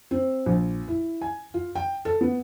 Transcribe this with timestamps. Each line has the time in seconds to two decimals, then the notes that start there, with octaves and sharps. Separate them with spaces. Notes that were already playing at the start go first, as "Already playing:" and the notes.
0.11 C4
0.46 A#1
0.88 E4
1.21 G#5
1.54 F4
1.75 G5
2.05 A4
2.21 B3